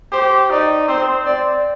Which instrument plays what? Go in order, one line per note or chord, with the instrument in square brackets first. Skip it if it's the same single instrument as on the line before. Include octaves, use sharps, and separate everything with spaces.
[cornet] G4 [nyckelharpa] C5
[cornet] D#4 [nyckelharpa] D5
[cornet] C4 [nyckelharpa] C5
[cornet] C4 [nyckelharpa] D5